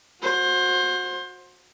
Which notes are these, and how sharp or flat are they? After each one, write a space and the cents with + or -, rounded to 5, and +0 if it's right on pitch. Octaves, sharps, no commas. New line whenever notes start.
F#4 -25 C5 +20